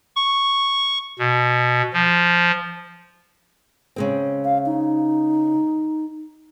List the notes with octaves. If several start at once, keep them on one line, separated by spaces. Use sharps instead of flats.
C#6
B2
F3
C#3 G#3 C4
F5
D#4